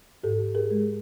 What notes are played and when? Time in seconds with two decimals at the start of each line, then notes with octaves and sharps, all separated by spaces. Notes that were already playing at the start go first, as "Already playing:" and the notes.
0.23 G#2 G4 A4
0.55 G#4 A#4
0.71 G#3